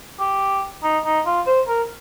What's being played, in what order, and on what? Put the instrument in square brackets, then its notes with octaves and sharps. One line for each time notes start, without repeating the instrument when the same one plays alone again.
[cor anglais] G4
D#4
D#4
F4
C5
A#4